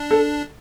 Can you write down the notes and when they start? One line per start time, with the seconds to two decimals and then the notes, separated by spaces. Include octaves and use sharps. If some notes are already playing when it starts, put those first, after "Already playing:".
Already playing: D4
0.11 A4